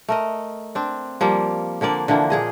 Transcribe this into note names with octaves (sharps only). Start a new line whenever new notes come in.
A3 A#4 D#5
C4 D4
F3 G3 A#3
D3 F3 A#3 D5
D3 E3 F3 A#3
A#2 G#4 D#5